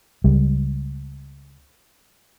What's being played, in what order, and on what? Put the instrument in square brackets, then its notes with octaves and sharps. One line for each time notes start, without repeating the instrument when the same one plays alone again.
[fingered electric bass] C#2 G3